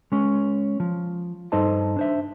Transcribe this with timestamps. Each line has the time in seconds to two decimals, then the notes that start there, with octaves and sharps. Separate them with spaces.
0.12 G#3 C#4
0.80 F3
1.52 G2 D#4 A4 C5 D#5 A5
1.97 D4 C5 E5